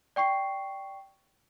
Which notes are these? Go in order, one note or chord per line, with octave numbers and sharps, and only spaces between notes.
D5 G5 C#6 C7